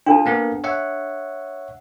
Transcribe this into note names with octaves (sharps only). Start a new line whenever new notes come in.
D4 F4 A4 A5
A#3 B3 A#4
C#5 E5 F#5